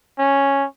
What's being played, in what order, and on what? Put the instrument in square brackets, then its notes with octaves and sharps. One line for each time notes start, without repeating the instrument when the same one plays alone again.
[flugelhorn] C#4